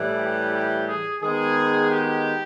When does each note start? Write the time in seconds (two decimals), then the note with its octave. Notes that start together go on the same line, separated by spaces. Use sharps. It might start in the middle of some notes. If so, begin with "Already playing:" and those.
Already playing: A2 E3 G3
0.18 G4
0.53 G4
0.88 G#4
1.22 D#3 G#3 B3 G#4
1.91 G4